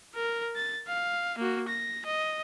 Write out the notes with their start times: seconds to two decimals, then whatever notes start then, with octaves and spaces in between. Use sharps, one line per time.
0.15 A#4
0.56 A6
0.88 F5
1.38 A#3 F#4
1.68 A#6
2.06 D#5